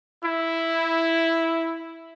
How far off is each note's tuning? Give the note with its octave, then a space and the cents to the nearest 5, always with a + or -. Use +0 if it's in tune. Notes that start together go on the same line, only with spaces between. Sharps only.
E4 +0